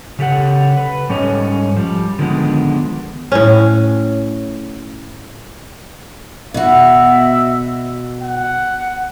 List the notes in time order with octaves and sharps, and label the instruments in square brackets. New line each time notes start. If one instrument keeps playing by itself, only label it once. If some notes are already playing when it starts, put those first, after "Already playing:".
[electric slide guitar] C#3 G4 A4 F#5
B4
G#2 G3 C#4 A4 C#5 D#5
F3 G3
D3 D#3 F3 G#3 A#3 B3
[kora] A2 C#4
[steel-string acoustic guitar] B2 F#4 [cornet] E5
[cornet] F#5